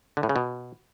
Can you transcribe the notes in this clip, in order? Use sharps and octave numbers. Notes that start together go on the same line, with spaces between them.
D3
A2
C#3
B2